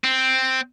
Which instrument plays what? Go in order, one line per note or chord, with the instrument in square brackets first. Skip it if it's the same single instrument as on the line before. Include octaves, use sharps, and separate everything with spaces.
[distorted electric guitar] C4